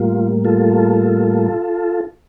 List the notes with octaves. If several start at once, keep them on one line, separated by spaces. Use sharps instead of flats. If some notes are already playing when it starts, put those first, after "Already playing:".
Already playing: A2 G3 A#3 F4
F4 A4